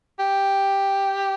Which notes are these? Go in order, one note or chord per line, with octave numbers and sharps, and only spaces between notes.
G4